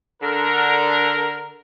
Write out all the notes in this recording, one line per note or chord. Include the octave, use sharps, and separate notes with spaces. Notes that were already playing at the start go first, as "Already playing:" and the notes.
D3 A#4